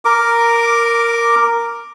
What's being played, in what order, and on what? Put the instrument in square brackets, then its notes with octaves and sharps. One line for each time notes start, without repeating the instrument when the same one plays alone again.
[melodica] A#4 D6